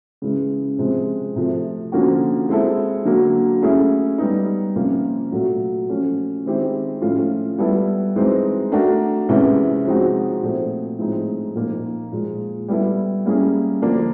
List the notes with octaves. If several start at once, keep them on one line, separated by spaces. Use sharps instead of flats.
C#3 E3 G#3
C3 F3 G#3 C4
C3 F3 A3
D3 F3 A#3 C#4 F#4
G#3 C4 E4 A4
D3 F#3 A#3
A3 C#4 E4 G#4
G3 B3 D#4
C3 F3 A#3 C#4 F4
A#2 F#3 A3
F3 A3 C#4
D#3 G#3 C4 E4 G4
A2 F3 A3 C#4 F4
G3 B3 E4 A4
E3 G#3 C4 D#4
A3 D4 F#4 A#4
C3 E3 G#3 C#4 E4
F3 G#3 C4 D#4 F#4
A#2 F3 A3 C4
A2 F3 G#3 C4 D#4
A#2 F3 A#3 D#4
A#2 F3 G#3
G3 B3 E4 A4
G3 A#3 C#4 E4 G#4
D3 F3 A#3 D4